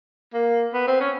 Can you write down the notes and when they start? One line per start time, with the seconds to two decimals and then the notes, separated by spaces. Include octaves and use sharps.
0.34 A#3
0.74 B3
0.87 C4
1.00 C#4